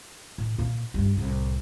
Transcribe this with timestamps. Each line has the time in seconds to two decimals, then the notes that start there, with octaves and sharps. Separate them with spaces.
0.38 A2
0.58 A#2 F4
0.94 G2 G3
1.17 C2 A2